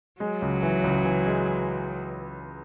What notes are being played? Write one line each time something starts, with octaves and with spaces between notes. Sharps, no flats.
F#3 G#3
C#2
E3
C#2
E3
G#3